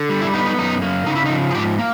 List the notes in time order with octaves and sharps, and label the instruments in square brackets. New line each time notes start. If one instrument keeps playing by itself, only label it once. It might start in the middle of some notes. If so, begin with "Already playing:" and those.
Already playing: [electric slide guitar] D3
G3
E4
B3 D#4
D#4
F#2 D#4
A#3
C#3 D#4
E4
D#4
F3
G#4
G#2 G4
A#3